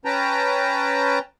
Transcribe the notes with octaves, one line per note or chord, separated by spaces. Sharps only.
C#4 B4 G5 A5 A#5